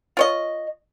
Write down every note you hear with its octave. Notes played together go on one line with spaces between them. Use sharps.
F4 C#5 D#5